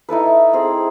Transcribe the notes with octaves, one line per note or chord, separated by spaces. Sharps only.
D#4 E4 A4 B4
C4 G#4